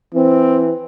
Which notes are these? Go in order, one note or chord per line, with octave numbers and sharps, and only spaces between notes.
E3 C4